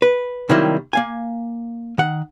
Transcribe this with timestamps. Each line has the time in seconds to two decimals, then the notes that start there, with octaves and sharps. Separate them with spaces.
0.02 B4
0.49 C3 D#3 F#3 G3 A#3 E4
0.93 A#3 F5 G#5
1.98 D#3 F#5